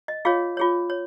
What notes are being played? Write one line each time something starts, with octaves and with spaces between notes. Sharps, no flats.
D#5
F4 G#4 C#5 F5
F4 G#4 C#5
C#5